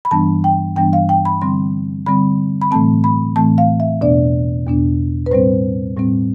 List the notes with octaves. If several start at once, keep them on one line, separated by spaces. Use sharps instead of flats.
B5
G2 E3 G3 B3 D4 A5
G5
G2 E3 G3 B3 D4 G5
F5
G5
B5
D3 G3 C4 C6
D3 G3 C4 B5
B5
A2 E3 A3 C4 A5
B5
A2 E3 A3 C4 A5
F5
E5
E2 B2 B3 D4 D5
E2 B2 B3 D4
B4
A2 G3 C4 C5
A2 G3 C4